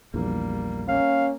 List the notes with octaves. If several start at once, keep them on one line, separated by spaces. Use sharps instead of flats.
A#1 E2 G3 A#3
A#3 C#4 F5